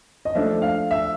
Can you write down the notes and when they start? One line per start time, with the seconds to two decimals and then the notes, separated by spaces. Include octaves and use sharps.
0.25 D#5
0.35 F3 A3 D4 E5
0.62 F5
0.91 E5